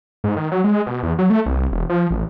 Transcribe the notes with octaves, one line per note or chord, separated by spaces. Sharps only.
G#2
D#3
F#3
G#3
B2
E2
F#3
A3
C2
E1
F3
A1